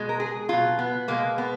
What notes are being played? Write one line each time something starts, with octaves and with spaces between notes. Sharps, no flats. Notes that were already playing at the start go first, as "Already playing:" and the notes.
Already playing: B2 G#3
A#4
G#4
B2 F#3 F4
B3
B2 G#3 A#3
B3